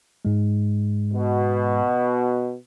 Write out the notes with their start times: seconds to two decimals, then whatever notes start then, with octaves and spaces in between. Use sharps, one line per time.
0.25 G#2 G#3
1.13 B2